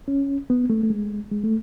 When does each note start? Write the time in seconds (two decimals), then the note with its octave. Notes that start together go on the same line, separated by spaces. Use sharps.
0.08 C#4
0.50 B3
0.70 A3
0.83 A3
0.90 G#3
1.31 G#3
1.44 A3